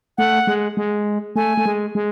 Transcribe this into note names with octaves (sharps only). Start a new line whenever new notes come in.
A3 F#5
G#3
G#3
A3 G#5
A3
G#3
G#3